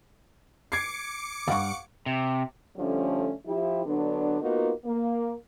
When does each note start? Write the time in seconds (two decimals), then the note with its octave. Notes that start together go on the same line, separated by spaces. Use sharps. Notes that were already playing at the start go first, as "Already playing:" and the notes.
0.72 D6 G#6 C7 C#7
1.48 D2 G2 F5 F#5 C#6
2.06 C3
2.77 D3 F3 G3 A3 C#4
3.46 F3 E4 G4
3.85 D3 F#3 B3 D4
4.41 A#3 B3 D#4 F4 F#4 A#4
4.85 A#3